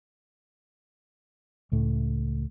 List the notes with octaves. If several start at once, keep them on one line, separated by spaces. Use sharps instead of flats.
C#2 A2 A3